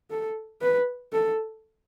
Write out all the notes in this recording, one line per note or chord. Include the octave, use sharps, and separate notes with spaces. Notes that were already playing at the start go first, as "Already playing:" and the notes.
A4
B4
A4